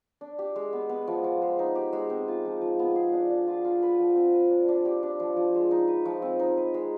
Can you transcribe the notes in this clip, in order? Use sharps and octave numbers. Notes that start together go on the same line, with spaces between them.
D4
G4
G#3
B3
B3
F3
F3
G#3
D#4
G4
G#3
C4
F4
F3
F3
B3
G#4
D4
D4
F4
F4
B4
F3
C4
B4
D4
D4
G4
D4
F3
F3
G#3
D#4
B4
F3
C4
D#4
B4
G#3